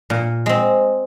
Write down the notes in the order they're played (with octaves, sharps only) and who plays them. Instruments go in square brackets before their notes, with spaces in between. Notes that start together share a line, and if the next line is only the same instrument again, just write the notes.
[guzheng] A#2
G#3 C4